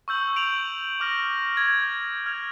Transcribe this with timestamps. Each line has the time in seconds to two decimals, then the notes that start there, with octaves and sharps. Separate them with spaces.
0.08 C#6 E6 G6 F#7
0.36 D7 F7 F#7
1.00 D6 F6 A#6
1.57 G#6
2.26 F6 G#6 F7